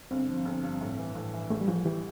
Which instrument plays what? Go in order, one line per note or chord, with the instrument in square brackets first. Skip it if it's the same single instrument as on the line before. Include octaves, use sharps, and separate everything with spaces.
[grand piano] G1 [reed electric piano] C4
[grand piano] F3
G1
G2
A2
E3
A2
E3
[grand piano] A1 [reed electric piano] A3
[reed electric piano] G3
[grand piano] A1 [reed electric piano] F3
[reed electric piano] E3 [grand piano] G3